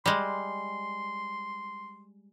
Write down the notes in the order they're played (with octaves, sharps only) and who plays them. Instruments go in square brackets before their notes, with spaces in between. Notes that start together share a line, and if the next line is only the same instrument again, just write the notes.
[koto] G3 G#3 [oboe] C6